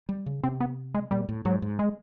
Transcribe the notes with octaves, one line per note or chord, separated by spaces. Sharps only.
G3
C#3
C3 C4
B3
G#3
A#2 G3
A2
G#2 F#3
G#2
G#3